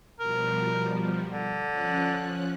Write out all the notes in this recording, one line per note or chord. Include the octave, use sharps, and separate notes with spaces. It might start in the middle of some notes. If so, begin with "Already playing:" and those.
B2 F3 G3 A#4
D3
F3 C#4 F#6